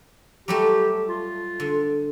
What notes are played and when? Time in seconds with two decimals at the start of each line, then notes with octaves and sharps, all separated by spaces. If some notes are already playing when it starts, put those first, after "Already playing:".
0.48 F#3 G3 A3 G4
1.09 F4
1.60 D3